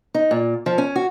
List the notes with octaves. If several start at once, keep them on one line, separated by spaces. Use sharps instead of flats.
D#4
A#2
F3
C#4
F#4